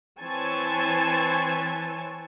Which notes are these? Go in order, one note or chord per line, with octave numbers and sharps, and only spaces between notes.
E3 C4 C#5 G#5 A5